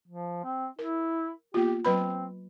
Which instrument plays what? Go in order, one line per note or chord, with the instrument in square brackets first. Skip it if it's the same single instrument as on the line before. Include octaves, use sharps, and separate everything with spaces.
[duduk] F3
C4
[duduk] E4 [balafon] A#4
[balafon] A#3 B3 F4 [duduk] G4
[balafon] F#3 B4 B5 [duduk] C4